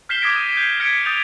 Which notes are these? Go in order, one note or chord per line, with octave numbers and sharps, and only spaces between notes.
F6 G6 B6 C7 E7 G7
D6 D#6 G6 G#6 A#6 D7
D#6 D#7 E7
G6 C7
F6 G#6 A#6 B6 C#7 D7
D#6 G6 A6 F7